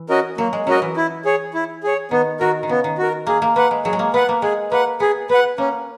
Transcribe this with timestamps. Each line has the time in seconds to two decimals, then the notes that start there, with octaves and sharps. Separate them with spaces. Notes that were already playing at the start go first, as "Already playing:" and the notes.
Already playing: E3
0.09 C#4 F#4 A#4 D#5
0.38 F#3 A#3
0.53 G#3
0.66 F#3 C#4 F#4 A#4 D#5
0.82 E3
0.97 E4
1.25 G#4 C#5
1.54 E4
1.83 G#4 C#5
2.11 D#3 B3
2.40 D#3 F#4 A#4
2.63 D#3
2.69 C#3 B3
2.84 D#3
2.98 F#4 A#4
3.27 A#3 G#4
3.42 A#3
3.56 A#3 B4 F#5
3.71 G#3
3.85 F#3 G#4
3.93 G#3
3.99 A#3
4.13 B3 B4 F#5
4.29 A#3
4.42 G#3 G#4
4.71 A#3 B4 F#5
5.00 B3 G#4
5.29 B3 B4 F#5
5.58 A#3 C#4